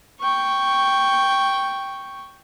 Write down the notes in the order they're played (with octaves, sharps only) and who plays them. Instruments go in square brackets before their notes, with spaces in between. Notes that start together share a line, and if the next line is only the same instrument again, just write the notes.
[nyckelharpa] G5 C#6